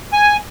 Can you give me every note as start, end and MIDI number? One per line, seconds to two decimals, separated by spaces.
0.13 0.37 80